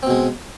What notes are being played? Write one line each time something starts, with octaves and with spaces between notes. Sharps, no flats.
B2 G#3 C4